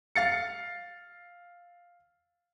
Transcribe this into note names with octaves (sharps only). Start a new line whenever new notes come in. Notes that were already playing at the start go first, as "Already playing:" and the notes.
F5 A6 C#7